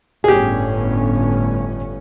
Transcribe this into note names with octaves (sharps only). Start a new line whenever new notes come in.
G1 A2 C#4 G4 G#4